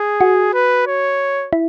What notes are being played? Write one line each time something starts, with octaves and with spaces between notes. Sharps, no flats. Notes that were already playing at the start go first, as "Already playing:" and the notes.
Already playing: G#4
F#4
B4
C#5
E4